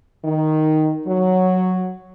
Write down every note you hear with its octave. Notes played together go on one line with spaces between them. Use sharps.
D#3
F#3